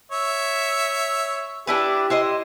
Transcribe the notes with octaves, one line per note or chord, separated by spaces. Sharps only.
C#5 E5
D4 E4 G4 B4
E4 C5 D#5